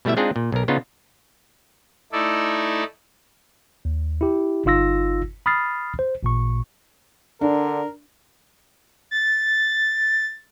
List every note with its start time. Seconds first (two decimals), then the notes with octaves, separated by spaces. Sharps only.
0.05 B2 G3 A3 E4 E5
0.17 G#3 C4 D4 D#4 F4 G#4
0.36 A#2
0.52 B1 A#4
0.68 C#3 B3 D4 D#4 F4
2.12 A3 D#4 E4 A4 D5
3.85 D#2
4.21 E4 G4
4.65 G1 D#4 F4 E6 A#6
5.46 B5 D#6 F6 A6 C7
5.99 C5
6.23 A1 A#2 C#6
7.41 D3 D4 A#4
9.11 A6